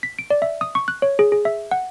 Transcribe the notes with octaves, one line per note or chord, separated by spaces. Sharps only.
B6
D7
D5
E5
D#6
C#6
F#6
C#5
G#4
G#4
E5
F#5